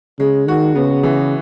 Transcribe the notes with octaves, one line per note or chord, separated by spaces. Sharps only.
C#3 G#3
D#3 F#4
C#3 B3
E3